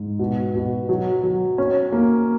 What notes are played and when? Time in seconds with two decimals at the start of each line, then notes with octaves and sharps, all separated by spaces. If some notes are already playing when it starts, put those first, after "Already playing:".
Already playing: G#2
0.19 B2
0.55 B2
0.89 F#3
1.23 F#3
1.58 C#4
1.92 A#3